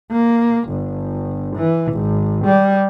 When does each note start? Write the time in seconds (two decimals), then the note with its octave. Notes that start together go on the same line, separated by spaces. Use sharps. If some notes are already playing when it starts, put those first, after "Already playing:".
0.11 A#3
0.69 G1
1.56 E3
1.92 G#1
2.45 G3